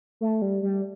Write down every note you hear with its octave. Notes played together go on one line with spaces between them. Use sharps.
A3
G3
G3